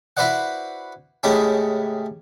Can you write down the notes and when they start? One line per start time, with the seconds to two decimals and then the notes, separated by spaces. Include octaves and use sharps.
0.17 E4 F#4 B4 C5 D5 F#5
1.23 A2 C#3 G#3 C#4 E4 G4